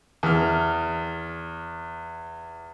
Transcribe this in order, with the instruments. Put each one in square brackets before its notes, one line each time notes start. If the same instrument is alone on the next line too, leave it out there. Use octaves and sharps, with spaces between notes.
[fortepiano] E2 F6